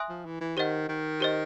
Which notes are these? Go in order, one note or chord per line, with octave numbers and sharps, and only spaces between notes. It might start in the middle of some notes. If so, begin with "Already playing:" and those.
Already playing: E5 G#5 C6 D#6 F#6
F3
E3
E3
D#3 G4 C5 D#5 F#5
D#3
G4 C5 D#5